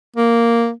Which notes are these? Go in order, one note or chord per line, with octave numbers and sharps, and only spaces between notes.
A#3